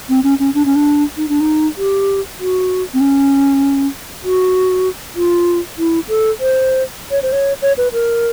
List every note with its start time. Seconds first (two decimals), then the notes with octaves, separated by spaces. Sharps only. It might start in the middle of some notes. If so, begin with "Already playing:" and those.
0.09 C4
0.24 C#4
0.39 C#4
0.54 D4
0.65 C#4
0.75 D4
1.17 D#4
1.29 D4
1.41 D#4
1.77 G4
2.40 F#4
2.94 C4
3.01 C#4
4.24 F#4
5.16 F4
5.78 E4
6.09 A4
6.40 C5
7.11 C#5
7.22 C5
7.32 C#5
7.62 C#5
7.78 B4
7.93 A#4